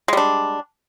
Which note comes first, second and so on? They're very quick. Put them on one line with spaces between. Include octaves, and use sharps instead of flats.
G#3 G3 D4